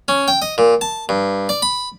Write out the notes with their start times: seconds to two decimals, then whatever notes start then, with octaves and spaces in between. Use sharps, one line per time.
0.08 C#4
0.28 G5
0.42 D#5
0.58 A#2
0.81 A5
1.09 G2
1.49 D5
1.62 B5